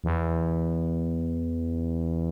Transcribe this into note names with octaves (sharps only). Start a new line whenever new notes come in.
E2